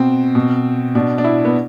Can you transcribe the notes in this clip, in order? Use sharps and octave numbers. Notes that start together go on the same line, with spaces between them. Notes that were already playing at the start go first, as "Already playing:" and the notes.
Already playing: B2 C4
B2
B2 D4
D4
E4
B3